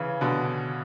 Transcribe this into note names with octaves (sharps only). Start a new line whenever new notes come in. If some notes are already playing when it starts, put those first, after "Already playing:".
Already playing: C#3 E3
B2 D3